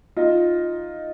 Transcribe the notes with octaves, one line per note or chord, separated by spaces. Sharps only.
D#4 F4